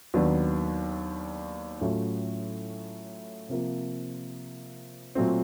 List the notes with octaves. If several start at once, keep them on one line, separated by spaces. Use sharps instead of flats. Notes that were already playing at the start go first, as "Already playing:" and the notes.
D#2 D#3 F#3 B3 D4
A2 F#3 A3 C#4 F4
C3 F3 A#3
A#2 F#3 A3 C4